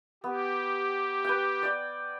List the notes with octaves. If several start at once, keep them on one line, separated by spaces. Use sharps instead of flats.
B3 G4
B4 G5
D5 G5